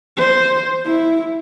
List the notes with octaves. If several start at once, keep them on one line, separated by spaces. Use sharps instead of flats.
C5
E4